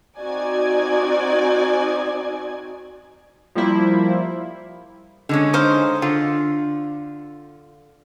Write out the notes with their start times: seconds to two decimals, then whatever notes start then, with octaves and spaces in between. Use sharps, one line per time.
0.18 C4 D#4 F#4 D5 G#5 G#6
3.55 F3 G3 A#3 E4 C5
5.29 D3 G#3 C#4
5.53 D#4 C5 F5
6.02 D3 F4